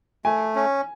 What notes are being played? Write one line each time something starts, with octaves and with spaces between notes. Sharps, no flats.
A3 G#5
C#4